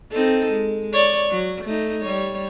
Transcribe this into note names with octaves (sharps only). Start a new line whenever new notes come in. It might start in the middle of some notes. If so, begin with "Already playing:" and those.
C4 D#4 A4
G#3
C#5 D5
F#3
A3 D#4
G3 C#5